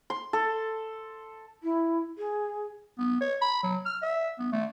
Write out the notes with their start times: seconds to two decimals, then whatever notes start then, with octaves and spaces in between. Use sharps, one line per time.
0.10 C6
0.33 A4
1.63 E4
2.17 G#4
2.98 B3
3.21 C#5
3.41 B5
3.63 F#3
3.85 F6
4.02 E5
4.39 B3
4.52 A3